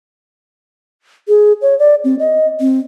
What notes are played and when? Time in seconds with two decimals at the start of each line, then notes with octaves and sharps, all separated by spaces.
1.28 G#4
1.62 C#5
1.79 D5
2.04 C4
2.19 D#5
2.60 C4